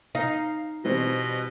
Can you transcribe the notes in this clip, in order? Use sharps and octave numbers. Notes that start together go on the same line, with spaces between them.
D#4 F5
B2 E3 G3 C4 D#5